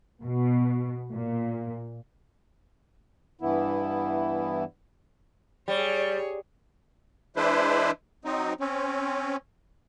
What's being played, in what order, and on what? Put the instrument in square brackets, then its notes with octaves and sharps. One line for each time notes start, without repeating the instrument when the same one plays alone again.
[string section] B2
A#2
[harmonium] G2 E3 B3 E4
[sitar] G3 [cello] G#4 C#5
[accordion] E3 G#3 D4 E4 B4 C5
F#3 C4 D#4
C4 C#4